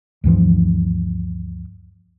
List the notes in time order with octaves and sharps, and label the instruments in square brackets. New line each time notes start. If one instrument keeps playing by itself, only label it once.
[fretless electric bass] D2 G2 E3 F3